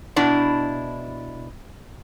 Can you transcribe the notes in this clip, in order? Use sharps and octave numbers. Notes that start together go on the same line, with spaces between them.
B2 D4 E4